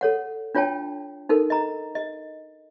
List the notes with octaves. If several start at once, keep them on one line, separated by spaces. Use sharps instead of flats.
A4 C#5 F#5
D4 F4 C#5 G5 A5
D#4 A4 A#4
D#5 A#5
D#5